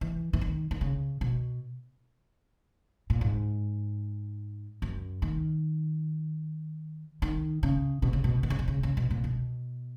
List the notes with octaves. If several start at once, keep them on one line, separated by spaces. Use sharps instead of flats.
E3
E3
D#3
D#3
C#3
B2
A#2
G#2
F#2
D#3
D#3
C#3
B2
C#3
B2
D#3
C#3
B2
C#3
C#3
B2
A#2
B2